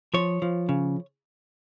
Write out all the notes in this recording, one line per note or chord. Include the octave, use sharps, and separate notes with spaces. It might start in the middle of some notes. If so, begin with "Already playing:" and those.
F3 C#5
F3
C#3